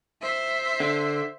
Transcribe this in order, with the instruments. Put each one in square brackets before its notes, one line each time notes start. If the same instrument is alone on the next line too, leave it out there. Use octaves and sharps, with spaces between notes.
[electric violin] C5 E5
[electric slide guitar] D3